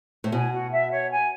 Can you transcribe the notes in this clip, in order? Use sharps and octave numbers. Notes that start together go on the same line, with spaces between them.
A2
B2 G#5
F#4
E5
C#5
G#5